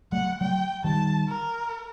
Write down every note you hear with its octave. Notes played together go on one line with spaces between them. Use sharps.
F#3 A3 F#5
F#3 A3 G5
D#3 G3 A5
A#4